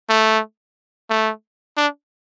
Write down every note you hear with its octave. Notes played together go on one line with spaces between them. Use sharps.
A3
A3
D4